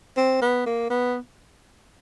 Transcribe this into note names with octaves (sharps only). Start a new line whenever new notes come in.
C4
B3
A#3
B3